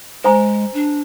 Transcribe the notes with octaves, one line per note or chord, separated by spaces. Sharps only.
G#3 C5 G#5 A#5
D4